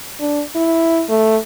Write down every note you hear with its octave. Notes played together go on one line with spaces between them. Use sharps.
D4
E4
A3